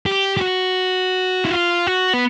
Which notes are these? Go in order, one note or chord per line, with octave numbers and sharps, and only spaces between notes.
G4
G4
F#4
E4
F4
F#4
B3